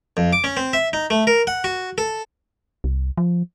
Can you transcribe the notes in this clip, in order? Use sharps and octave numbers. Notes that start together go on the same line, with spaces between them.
F2
D6
C#4
C4
E5
D#4
A3
A#4
F#5
F#4
A4
C2
F3